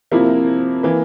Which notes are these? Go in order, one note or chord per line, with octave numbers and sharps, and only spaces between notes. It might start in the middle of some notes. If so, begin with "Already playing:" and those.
C3 F3 A#3 E4
E3 A#3